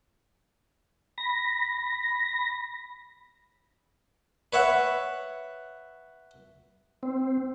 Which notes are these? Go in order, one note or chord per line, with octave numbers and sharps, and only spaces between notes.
B5 A#6
B4 C#5 E5 F#5
C4